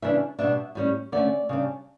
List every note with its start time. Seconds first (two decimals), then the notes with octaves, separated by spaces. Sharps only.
0.02 C#3 E3 G3 D4 E5
0.39 B2 G3 D4 E5
0.75 A2 G3 C#4
1.12 D3 A3 C#4 D5
1.49 C#3 G3 D4